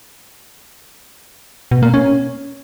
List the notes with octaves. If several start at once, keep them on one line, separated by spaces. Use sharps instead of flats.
B2
A#3
C#4